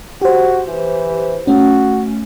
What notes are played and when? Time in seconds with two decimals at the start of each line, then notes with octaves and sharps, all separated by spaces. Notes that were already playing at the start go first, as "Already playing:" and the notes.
0.22 F#4 G4 C5
0.67 E3
1.47 A3 C#4 F#4